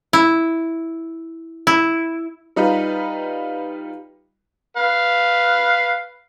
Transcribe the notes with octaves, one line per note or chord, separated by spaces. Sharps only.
E4
E4
G3 D#4 F4 B4
B4 F5